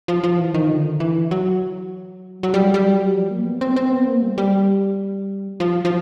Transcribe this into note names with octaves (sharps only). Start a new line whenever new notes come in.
F3
F3
E3
D#3
D3
E3
F#3
F#3
G3
G3
F#3
F3
A#3
B3
C4
C4
B3
A#3
G3
G3
F3
F3